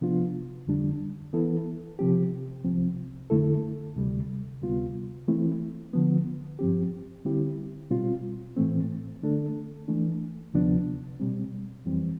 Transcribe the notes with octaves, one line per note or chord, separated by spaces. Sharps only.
C3 F3 B3 D4 F4
F2 D3 G3 D4
E3 B3 E4 A4
C3 F3 C4 G4
C2 C3 F3 C4
F2 D3 A3 E4 A4
D2 C3 G3
D2 C3 G3 B3 F4
E3 A3 C4 E4
D3 F3 B3
G2 F3 C4 G4
D3 G3 C4 E4 G4
B2 G3 C4 F4
A2 E3 A3 C4
D3 A3 D4 A4
E3 A3 D4
D2 C3 F3 B3 D4
B2 G3 C4
F2 E3 G3 C4